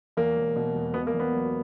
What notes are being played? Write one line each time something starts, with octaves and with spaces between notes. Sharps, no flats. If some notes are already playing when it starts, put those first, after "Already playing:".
E2 A#3
E1
B2
E1
B2 B3
A#3
E2
B3
F#3